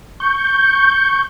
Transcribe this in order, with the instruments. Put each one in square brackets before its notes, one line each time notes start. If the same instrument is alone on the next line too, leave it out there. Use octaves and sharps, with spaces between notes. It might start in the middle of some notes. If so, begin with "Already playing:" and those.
[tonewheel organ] C#6 G6